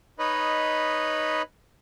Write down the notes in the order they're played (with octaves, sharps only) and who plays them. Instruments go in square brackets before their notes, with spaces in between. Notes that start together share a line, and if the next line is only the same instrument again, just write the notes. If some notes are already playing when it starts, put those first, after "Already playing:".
[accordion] D#4 B4 C#5 D#5 B5